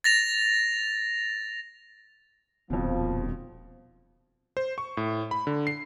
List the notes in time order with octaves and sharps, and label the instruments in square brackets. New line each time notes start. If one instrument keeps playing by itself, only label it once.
[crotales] A6 A#6 F7
[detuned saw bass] D#1 [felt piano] F2 B2 [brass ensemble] F3
[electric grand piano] C5
C#6
A2
B5
D3
C7